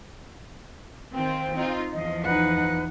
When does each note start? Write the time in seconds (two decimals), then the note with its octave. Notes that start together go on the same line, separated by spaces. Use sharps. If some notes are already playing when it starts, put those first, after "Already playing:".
1.14 D#3 C4 F4 G5
1.54 C4 D#4 F4
1.93 E2 F3 D#5
2.25 D#4 B4 F#5